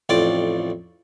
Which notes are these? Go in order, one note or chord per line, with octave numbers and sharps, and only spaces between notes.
A1 F2 D5 G5 C6 D6